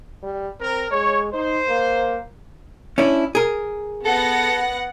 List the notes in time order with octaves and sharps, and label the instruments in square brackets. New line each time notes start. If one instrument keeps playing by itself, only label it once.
[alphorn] G3
[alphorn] C4 [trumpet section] A#4
[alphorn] G#3 [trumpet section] C#5
[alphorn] D#4 [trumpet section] C5
[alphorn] A#3
[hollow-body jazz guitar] C#4 D4 E4
G#4 A#4
[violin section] B3 F#5 A#6 [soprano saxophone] A4